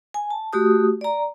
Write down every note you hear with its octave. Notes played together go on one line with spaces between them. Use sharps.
G#5
A5
A3 F#4 G4 D#6
D5 A#5